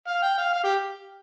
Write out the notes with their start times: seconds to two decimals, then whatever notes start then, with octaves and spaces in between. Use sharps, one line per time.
0.07 F5
0.22 G5
0.38 F5
0.53 F5
0.64 G4